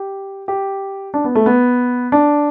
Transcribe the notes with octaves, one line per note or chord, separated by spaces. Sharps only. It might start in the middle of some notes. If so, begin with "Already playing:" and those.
Already playing: G4
G4
D4
B3
A3
B3
D4